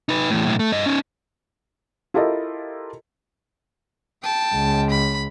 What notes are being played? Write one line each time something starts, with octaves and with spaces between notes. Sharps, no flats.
D#4 B4
E2 A2
B1 A2
A3
G2 D#5
C#4 D#4
E4 F4 G4 A4 A#4 D#5
G5 A5
C#2
B5